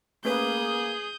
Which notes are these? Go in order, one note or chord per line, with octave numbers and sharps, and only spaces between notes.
A3 A#3 C#4 G#4 B4 D#6 G6